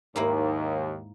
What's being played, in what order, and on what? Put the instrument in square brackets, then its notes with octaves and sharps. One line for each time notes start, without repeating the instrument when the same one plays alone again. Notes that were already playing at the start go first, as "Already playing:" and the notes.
[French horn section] D#2 [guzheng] G#2 A#3 E4